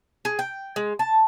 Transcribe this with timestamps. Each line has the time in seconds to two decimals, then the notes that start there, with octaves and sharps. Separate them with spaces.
0.25 G#4
0.39 G5
0.76 G#3
0.99 A5